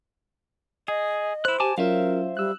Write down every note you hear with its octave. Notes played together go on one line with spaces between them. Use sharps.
G#4 D#5
E4 C5 F#6
G4 G#5 A5 D6
F#3 C#4 F4 A#4 C5 E5 F5
G3 E6 F#6